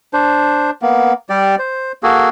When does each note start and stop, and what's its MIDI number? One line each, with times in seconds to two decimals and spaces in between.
0.13 0.71 62
0.13 0.71 72
0.82 1.13 58
0.82 1.13 59
1.29 1.55 55
1.29 1.55 67
1.29 1.55 74
1.59 1.92 72
2.03 2.29 58
2.03 2.29 66
2.03 2.29 68
2.03 2.29 69